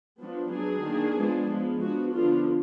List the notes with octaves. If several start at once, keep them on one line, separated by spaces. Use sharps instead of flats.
F3 B3 D4
F#3 B3 D4 G#4
D#3 A#3 D4
F3 G#3 B3 D4
F3 G#3 B3
F3 B3 D4 F#4
D3 F3 B3 D4 F4